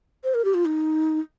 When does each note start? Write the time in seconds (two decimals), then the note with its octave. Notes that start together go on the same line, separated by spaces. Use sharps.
0.24 C5
0.34 A#4
0.45 G4
0.54 F4
0.65 D#4